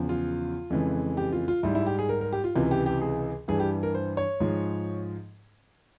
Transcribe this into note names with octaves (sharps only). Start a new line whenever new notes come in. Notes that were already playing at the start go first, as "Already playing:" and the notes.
Already playing: E2 C#3 F3
F4
F2 C#3 E3 G#3
G4
F4
F4
G#2 G3 E4
E4
G4
G#4
A#4
A#4
G4
F4
C#2 C3 E3 F4
G4
G4
G#4
G2 E3 G3 G#4
G4
A#4
C5
C#5
G#2 F3 G#3